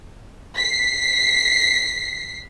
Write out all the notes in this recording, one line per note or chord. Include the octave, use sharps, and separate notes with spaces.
B6 C7